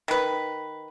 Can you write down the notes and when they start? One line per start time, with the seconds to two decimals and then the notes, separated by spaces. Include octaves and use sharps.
0.08 D#3 B4